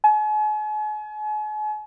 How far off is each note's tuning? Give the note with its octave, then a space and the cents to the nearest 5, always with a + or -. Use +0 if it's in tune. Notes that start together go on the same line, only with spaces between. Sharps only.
G#5 +40